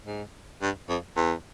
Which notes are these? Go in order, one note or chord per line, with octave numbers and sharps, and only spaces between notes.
G#2
G2
F2
E2